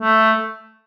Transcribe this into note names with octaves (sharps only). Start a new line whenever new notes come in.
A3